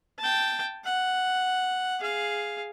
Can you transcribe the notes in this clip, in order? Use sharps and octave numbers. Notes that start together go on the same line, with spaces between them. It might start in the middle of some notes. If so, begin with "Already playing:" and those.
G5 A5
F#5
G#4 F5